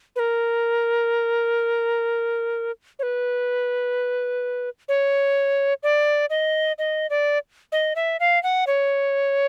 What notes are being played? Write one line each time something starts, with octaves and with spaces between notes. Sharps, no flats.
B4
A#4
C#5
B4
C#5
D5
D#5
D#5
D5
D#5
E5
F5
F#5
C#5